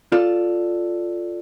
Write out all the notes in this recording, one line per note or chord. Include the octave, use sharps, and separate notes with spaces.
F4 A4 D5